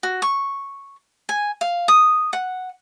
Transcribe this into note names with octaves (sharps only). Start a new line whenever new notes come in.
F#4
C#6
G#5
F5
D#6
F#5